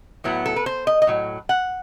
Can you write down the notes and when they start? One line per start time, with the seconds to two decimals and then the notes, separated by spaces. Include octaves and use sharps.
0.24 A2 F#3 B3 E4
0.46 A4
0.56 B4
0.66 C5
0.87 D#5
1.02 D#5
1.07 A2 F#3
1.49 F#5